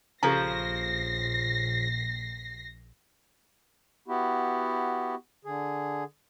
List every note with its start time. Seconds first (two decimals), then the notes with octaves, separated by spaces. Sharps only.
0.23 A#1 C#3 F3 G4 A4 A#5 A#6 C7
4.08 B3 E4 F#4 G4
5.45 D3 G#4